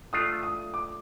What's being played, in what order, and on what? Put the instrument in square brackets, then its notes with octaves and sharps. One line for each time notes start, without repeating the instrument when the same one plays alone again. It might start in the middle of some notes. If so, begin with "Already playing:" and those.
[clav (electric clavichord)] A3 D4 F4 [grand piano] D#6
[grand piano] D#6
D6